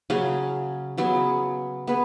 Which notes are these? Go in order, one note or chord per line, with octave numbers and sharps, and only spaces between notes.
C#3 F#3 C#4 G#4
C#3 F#3 B3 G#4
B3 G#4 B4